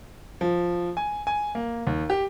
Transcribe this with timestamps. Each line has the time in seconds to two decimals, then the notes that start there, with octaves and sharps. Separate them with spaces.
0.41 F3
0.97 G#5
1.27 G#5
1.55 A#3
1.87 D#2
2.10 G4